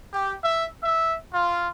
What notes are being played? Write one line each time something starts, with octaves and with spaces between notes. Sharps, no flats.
G4
E5
E5
F4